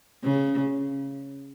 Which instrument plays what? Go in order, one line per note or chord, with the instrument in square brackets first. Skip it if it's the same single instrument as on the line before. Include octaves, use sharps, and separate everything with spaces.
[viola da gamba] C#3